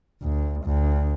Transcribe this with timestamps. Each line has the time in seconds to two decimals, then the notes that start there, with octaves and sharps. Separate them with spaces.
0.22 D2
0.65 D2